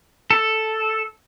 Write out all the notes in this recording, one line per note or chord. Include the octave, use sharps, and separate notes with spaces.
A4